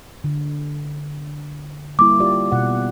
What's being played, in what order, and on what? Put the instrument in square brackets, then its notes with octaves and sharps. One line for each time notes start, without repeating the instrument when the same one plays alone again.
[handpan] D3
[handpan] G3 A#3 E4 [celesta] D6
[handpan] F4 G4 D5
B2 F#5